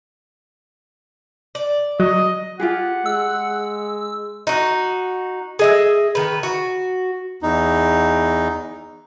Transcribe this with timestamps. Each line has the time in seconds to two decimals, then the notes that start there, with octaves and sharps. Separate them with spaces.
1.55 D5
2.00 F#3 D#5
2.60 F4 G4 G#4 F#5
3.06 G#3 E6
4.47 D#4 F#4
5.59 G#4 D#5 E5
6.15 D#3 B4
6.43 F#4
7.43 E2 D#4